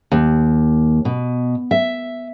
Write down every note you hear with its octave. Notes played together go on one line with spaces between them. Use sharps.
D#2
B2
E5